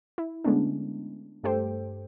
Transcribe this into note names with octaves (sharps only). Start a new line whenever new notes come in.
E4
D3 G#3 A3 B3 C#4 D4
G2 A3 G4 A4 C5 G5